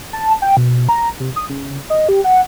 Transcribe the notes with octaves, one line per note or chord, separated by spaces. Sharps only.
A5
G5
B2
A#5
C3
D#6
C#3
D#5
G4
F#5